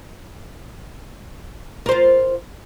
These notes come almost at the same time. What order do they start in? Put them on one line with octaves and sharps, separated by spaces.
A#4 C5 F4